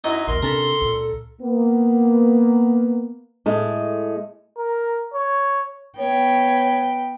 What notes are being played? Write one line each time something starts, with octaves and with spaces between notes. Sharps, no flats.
F#2 D#4 E4
A#1 D#2 A#4 C6
C3 C#4 D4 A4 A#4 A5 B5
C#2 A#2
A#3 B3
A2 G#3 A3
A#4
C#5
B3 C#5 G5